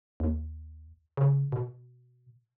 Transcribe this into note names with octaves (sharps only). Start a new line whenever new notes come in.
D#2
C#3
B2